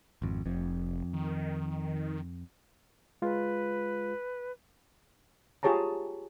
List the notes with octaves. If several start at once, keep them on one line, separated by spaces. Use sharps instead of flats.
G#1 F2
F1 F2
D#3
G#3 F4 B4
F4 G4 G#4 C#5 A5 A#5